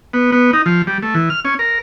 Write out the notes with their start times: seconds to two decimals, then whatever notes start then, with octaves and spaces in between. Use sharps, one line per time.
0.13 B3
0.32 B3
0.53 D#4
0.66 F3
0.87 G3
1.03 A3
1.15 E3
1.30 F6
1.45 C#4
1.59 A#4